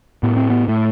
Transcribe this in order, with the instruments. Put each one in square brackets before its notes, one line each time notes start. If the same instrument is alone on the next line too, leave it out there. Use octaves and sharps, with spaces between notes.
[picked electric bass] A2 B3
C4
B3
A2 A3